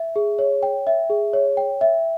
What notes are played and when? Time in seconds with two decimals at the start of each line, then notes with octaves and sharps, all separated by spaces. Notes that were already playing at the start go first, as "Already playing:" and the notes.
Already playing: E5
0.16 G#4
0.39 C#5
0.63 G5
0.87 E5
1.10 G#4
1.33 C#5
1.57 G5
1.81 E5